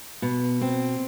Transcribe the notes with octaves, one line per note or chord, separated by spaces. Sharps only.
B2
C4